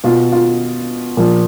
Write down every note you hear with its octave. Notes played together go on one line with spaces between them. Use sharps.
B2 F4
F4
A#2 F3